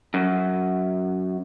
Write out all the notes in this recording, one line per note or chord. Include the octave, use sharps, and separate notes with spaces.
F#2